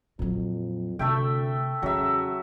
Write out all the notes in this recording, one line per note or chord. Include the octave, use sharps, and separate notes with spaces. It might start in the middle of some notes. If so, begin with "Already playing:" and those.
F2 A#2 F#3
D2 C3 A3 E5 G5
E2 C#3 F#3 E5